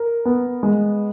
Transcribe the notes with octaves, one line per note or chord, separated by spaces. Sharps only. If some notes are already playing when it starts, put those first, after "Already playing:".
Already playing: A#4
B3
G#3